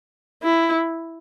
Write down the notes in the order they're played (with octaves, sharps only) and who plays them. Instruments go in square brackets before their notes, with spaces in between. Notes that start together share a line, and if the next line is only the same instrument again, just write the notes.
[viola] E4